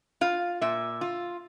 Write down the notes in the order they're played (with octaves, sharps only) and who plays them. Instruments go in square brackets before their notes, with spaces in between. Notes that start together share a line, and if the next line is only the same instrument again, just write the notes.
[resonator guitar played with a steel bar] F4 F5
A#2 E5
F4